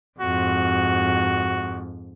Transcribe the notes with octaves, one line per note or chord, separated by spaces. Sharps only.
F2 G#2 F#4